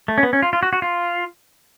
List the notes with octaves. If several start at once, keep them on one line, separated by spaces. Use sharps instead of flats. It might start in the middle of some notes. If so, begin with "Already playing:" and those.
A3
C#4
B3
C#4
F4
F4
F#4
F#4
F4